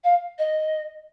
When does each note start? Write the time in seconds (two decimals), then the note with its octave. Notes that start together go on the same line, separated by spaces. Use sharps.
0.04 F5
0.38 D#5